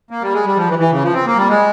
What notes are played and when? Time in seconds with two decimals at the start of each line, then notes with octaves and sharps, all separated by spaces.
0.11 A#3
0.21 G3
0.33 G#3
0.45 G3
0.57 F3
0.68 E3
0.79 E3
0.91 C#3
1.02 F3
1.14 C4
1.26 A#3
1.36 G3
1.49 G#3